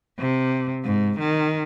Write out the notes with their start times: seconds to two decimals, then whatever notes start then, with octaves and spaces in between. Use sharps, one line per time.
0.19 C3
0.84 G#2
1.19 D#3